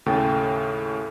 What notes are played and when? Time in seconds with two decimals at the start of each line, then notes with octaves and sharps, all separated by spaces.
0.06 D#2 A2 C#3 A4 G5